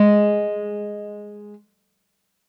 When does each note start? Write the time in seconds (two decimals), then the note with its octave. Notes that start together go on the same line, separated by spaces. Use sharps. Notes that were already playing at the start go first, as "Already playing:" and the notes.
Already playing: G#3